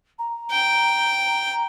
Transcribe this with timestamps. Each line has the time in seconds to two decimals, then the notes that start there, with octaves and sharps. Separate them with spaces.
0.18 A#5
0.51 G5